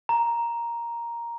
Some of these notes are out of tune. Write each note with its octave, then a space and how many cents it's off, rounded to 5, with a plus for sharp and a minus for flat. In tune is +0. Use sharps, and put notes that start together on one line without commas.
A#5 +5